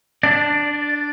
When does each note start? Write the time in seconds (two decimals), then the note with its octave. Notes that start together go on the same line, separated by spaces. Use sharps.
0.23 D4 D5